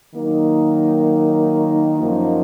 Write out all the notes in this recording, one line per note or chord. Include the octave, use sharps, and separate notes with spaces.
D#3 F#3 A#3 D#4
F#2 F3 A#3 D#4